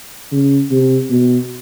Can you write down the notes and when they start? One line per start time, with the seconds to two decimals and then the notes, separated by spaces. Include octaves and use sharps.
0.32 C#3
0.71 C3
1.10 B2